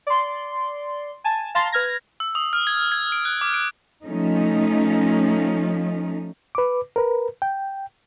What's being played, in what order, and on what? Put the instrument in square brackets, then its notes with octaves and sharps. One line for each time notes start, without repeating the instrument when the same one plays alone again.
[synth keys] D5 C6
G#5 A5
F5 A5 A#5 C6 A6
B4 F6 G#6 A#6
[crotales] E6
D#6
F6
G#6
G#6
D7
F#6
D6
D7
[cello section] F3 A3 C#4 D#4
[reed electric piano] B4 D6
A#4 B4
G5